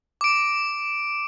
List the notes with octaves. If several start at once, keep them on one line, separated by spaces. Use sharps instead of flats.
D6 D7